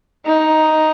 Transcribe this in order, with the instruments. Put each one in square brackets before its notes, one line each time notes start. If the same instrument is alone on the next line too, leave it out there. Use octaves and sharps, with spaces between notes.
[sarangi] D#4